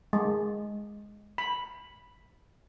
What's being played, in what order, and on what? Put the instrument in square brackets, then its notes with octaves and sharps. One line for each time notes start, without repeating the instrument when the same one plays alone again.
[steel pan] G#3
B5